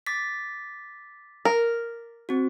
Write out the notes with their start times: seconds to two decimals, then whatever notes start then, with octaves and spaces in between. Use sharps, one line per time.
0.07 D6 A6 B6
1.45 A#4
2.29 C4 F#4